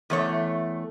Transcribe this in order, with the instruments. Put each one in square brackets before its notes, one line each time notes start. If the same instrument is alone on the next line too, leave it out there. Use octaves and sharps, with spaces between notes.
[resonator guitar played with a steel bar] E2 A3 C#5